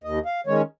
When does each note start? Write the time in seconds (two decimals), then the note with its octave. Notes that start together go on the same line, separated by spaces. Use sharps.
0.04 D#2 D#5
0.26 F5
0.47 D#3 G#3 C#4 C#5